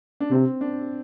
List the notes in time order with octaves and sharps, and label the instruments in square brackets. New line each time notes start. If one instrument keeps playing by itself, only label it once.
[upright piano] D4
[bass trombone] C3 [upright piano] C4
[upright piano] D4